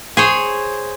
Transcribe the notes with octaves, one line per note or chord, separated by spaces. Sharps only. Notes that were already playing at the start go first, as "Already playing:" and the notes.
G#4 C5 C#5